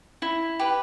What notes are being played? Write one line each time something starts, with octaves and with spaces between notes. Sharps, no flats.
E4
G4 B4